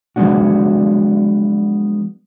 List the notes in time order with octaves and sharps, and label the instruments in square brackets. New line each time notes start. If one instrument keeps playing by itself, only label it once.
[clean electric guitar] F3 F#3 G#3 B3 D4 F#4